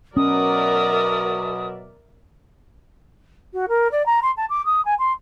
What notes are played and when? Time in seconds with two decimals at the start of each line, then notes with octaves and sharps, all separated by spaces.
0.17 B2 F#3 C#4 A#4 D5 E5 D#6
3.53 F#4
3.69 A#4
3.91 D5
4.06 A#5
4.22 C6
4.36 A5
4.49 D6
4.65 D#6
4.85 G#5
4.98 C6